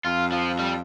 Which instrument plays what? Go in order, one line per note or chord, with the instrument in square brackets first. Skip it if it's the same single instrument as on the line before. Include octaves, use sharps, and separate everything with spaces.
[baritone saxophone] F2 [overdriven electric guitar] F4
[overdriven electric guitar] F3
G3